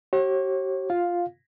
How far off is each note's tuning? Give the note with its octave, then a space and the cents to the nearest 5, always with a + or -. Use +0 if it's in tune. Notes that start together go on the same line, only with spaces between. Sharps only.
G4 -45 C#5 -40
F4 +0 F5 +5